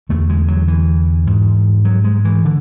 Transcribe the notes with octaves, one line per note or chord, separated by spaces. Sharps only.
E2 D3 A3
G#3
F#3
E3
G#2
F#3
G#3
E3
D3